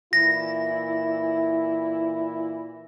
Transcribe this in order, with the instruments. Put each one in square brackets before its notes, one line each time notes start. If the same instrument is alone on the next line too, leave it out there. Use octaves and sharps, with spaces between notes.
[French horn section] A#2 E3 E4 [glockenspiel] A#6